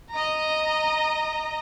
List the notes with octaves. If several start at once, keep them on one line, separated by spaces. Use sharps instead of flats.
D#5 A#5